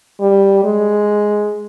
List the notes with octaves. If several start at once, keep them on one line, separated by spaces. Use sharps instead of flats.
G3
G#3